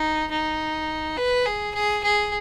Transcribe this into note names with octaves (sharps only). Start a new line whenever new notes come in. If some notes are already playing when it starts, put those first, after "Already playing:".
Already playing: D#4
D#4
B4
G#4
G#4
G#4